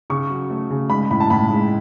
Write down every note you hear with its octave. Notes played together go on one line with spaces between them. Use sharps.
C#3 C#6
F#3
A3
C#3
G#3 B5
A2 B5
A5
A2 B5
G#3